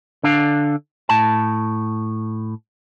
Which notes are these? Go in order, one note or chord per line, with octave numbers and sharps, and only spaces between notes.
D3 D4 F5
A2 A5